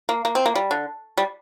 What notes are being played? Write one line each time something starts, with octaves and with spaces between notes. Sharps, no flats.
A#3
A#3
C4
A#3
G3
D3
G3